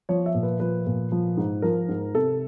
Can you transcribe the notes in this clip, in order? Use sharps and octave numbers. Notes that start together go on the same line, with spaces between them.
F3 C#5
E5
A#2
B4
F3 B4
A#2
F3
G#2
F3 A#4
G#2
C3 A4